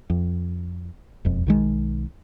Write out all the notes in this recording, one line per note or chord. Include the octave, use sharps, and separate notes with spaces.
F2
E1 F2
B1 D#3 G#3